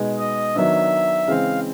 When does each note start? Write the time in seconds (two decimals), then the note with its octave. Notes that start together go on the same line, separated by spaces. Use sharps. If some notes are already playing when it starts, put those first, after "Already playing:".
Already playing: B2 G#3 B3 D#4
0.19 D#5
0.56 D#3 F#3 B3 D4 E5
1.28 C#3 E3 G#3 C4 F5